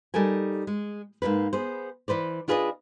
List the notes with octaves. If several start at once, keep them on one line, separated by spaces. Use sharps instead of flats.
G3 D#4 A4 A#4 G#5
G#3
G#2 C3 A#3 B4
B3 G#4 C5
E3 B4 C5 D5
D4 F4 G#4 B4 D5 D#5